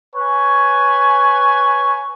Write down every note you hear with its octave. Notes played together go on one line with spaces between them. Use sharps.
B4 C#5 G#5